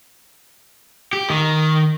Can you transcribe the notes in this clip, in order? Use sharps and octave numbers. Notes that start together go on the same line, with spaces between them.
G4
D#3